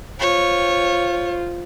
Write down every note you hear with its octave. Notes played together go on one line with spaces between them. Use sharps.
F4 C5 C#5